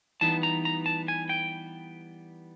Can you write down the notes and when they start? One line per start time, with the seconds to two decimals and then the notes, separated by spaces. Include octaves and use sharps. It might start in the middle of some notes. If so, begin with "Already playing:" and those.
0.21 E3 G3 B3 D#4 A5
0.43 A#5
0.65 A#5
0.86 A5
1.08 G#5
1.29 G5